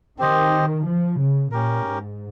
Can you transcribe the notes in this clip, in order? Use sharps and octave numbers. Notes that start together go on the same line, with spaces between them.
D#3 C4 G4 C5 D#5
F3
C#3
A#2 C#4 G4 A#4
G#2